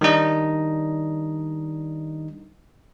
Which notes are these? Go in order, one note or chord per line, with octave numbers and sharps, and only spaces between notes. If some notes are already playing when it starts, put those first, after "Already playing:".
D#3 G3 D4 D#4 D#5